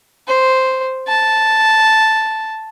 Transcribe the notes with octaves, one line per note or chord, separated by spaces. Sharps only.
C5
A5